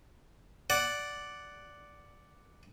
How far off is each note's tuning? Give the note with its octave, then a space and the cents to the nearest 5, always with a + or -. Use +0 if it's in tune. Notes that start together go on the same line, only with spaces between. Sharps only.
D5 -5 F#5 +5